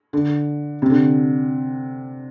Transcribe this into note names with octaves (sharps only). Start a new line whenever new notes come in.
D3
C3
D3